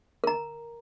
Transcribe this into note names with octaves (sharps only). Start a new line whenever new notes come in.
A#4 A#5